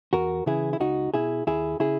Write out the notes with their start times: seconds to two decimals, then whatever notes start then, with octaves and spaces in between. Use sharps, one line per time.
0.13 E2 F#4 A#4
0.46 C#3 E3 E4 G#4
0.73 E4
0.80 C#2 D#4 F#4
1.14 B2 E4 G#4
1.47 D#2 E4 G#4
1.80 C#3 E4 G#4